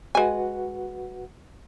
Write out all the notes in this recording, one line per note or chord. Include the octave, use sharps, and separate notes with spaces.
G#3 F#4 B4 F#5 G#5